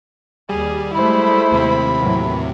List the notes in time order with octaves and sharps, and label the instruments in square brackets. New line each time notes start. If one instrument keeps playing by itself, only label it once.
[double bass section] D#2 [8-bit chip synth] G3 [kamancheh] G#4
[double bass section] G#3 A3 [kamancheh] E4 C5 [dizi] B5
[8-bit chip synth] D#2 C3
[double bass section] A2 E3 F#3